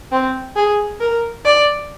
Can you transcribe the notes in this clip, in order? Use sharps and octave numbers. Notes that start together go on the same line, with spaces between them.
C4
G#4
A#4
D5